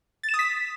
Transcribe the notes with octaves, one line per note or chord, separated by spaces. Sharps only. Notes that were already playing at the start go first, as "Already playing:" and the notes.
A6
E7
D#6
B6